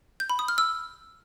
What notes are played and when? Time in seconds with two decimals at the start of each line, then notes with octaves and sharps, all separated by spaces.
0.20 G6
0.30 B5
0.39 D#6
0.48 F6
0.58 E6